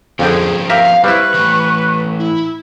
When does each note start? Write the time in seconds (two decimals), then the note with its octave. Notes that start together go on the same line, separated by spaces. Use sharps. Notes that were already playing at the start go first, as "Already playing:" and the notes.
0.19 F2 D3 F3 C4 C#4 G#4 G5
0.70 G4 A#4 E5 F5
1.04 G3 C4 E4 B4 C#6
1.34 A2 E3
2.18 E4